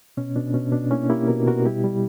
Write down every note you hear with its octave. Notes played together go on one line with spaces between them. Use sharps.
B2 C#4
B2 D4
B2 C#4
B2 D4
A#3 C#4 E4
A#3 E4 G4
B2 F#4 A#4
B2 F#4 A#4
G3 E4 G4
G3